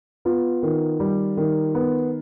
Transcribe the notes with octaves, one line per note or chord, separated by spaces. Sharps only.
B3 F4
D#3
G3
D#3
B3